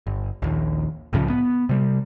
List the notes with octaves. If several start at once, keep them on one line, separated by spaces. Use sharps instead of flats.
G1
A#1 D#2
C2 A2 C#3 F3
B3
C3 G3